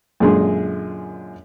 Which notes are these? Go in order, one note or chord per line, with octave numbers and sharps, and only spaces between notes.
F#2 A#2 D3 G#3 G#4 C6